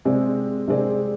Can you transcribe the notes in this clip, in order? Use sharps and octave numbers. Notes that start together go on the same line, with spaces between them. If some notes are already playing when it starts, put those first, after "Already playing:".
C3 G#3 C4 G#4 D5
C3 G#3 C4 G#4 D5